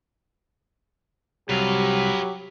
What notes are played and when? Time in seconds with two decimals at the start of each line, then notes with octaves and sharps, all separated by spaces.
1.49 C2 F#3 G4 B4 F5